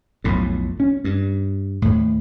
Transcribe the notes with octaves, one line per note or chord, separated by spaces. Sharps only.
B1 F2 A2
C#4
G2
D#2 A2